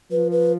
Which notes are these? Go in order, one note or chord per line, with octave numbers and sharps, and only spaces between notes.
F3 B4
B4